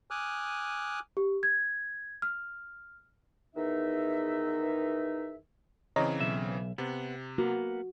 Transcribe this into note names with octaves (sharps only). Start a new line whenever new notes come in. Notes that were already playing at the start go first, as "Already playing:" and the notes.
G#5 D6 D#6 F6 F#6
G4
G#6
F6
E2 D#3 D#4 E5
C#3 E3 C4 C#5 D#5 A#5
B1 E5
C3 B3
A#3 B3 F#4